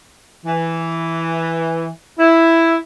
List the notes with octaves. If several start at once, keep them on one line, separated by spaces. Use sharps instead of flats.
E3
E4